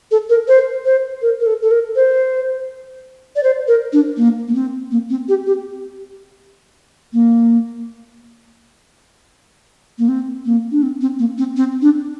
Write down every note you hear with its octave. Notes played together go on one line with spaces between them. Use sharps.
A4
A#4
C5
C5
A#4
A#4
A4
A4
A#4
C5
D5
C5
A#4
D4
A#3
A#3
C4
A#3
C4
G4
G4
A#3
A#3
C4
A#3
D4
C4
C4
A#3
C4
C4
D4